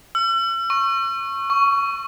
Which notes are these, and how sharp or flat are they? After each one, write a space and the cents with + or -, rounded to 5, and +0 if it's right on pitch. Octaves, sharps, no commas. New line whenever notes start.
E6 +45
C#6 -15
C#6 +15